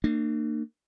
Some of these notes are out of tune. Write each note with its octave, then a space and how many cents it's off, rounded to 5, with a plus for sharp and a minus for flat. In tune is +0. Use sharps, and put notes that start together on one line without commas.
A#3 -30 D4 +45